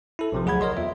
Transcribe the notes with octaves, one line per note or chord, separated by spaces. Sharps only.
E4 A4
A#1 C3 F3
D2 F#3 G#4 F#5 B5 G#6
A#4 C#5 D#5 C6
E2 F4 E5